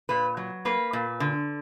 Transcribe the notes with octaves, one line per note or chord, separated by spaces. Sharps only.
A#2 B4
F#3
A#3 B4
A#2
D3